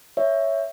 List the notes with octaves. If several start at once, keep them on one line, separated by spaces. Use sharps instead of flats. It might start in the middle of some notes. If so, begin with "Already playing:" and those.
C#5 E5